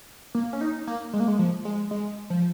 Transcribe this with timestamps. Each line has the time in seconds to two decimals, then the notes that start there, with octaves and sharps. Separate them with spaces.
0.35 A#3
0.53 C#4
0.61 D#4
0.87 A#3
1.13 G#3
1.20 A#3
1.28 G#3
1.39 F3
1.65 G#3
1.91 G#3
2.30 F3